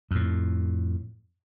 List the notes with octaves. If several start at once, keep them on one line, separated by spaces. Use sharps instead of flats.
F2 A2